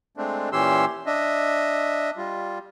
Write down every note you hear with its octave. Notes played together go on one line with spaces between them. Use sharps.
G#3 A3 C4 D4
A#2 E3 C#4 G4 C6 E6
D4 D#5 E5
G3 F4